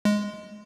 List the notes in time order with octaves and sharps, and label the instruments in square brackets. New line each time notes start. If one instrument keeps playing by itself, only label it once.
[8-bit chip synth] G#3